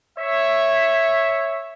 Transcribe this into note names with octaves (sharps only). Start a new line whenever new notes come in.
C#5 E5